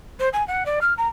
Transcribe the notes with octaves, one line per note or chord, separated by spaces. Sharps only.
C5
G#5
F#5
D5
F6
A#5